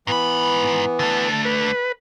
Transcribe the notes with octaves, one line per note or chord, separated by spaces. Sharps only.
G#2 E3 B3 B5
D3 A3 A5
B4